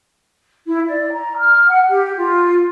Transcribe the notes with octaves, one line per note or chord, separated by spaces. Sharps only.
E4
D5
A#5
F6
F#5
G4
F4